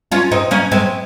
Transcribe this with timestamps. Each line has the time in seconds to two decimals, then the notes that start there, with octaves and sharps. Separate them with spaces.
0.12 C#4 F4
0.31 C4 D#4
0.51 A#3 C#4
0.71 G#3 C4